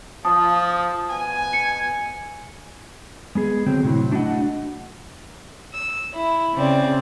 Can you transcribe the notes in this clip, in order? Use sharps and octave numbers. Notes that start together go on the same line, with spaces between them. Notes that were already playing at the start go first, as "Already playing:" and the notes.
F3 A5 D#6
B2 G#5
C#7
G#3 B3 G#4
D3 F#3 C4
A2 C3 F#3 E4
A3 D4 F#4 D#5 F#5
E6
E4
C#3 C4 D5